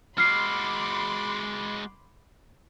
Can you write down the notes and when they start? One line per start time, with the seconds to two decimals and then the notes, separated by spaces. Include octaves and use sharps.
0.18 G#3 F#4 B5 C6 D6 F6 C7